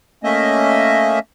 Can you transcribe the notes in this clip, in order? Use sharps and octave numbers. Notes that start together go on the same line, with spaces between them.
A3 A#3 C#4 D#5 E5